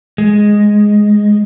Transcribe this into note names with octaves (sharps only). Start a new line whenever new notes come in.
G#3